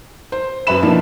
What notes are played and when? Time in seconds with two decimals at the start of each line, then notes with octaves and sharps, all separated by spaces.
0.32 C5
0.67 F#2 B4 E5 B5 E7
0.82 B2 F3 A#3 B3 D4 E4